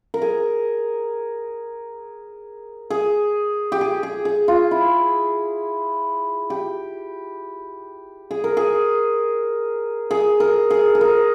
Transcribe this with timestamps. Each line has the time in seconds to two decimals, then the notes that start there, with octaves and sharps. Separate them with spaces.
0.14 A#4
0.22 G#4
2.90 G#4
3.72 G4
3.81 G#4
4.03 G#4
4.25 G#4
4.48 F4
4.71 E4
6.50 G4
8.31 G#4
8.44 A#4
8.57 G#4
10.11 G#4
10.40 A#4
10.70 G#4
10.95 G#4
11.01 A#4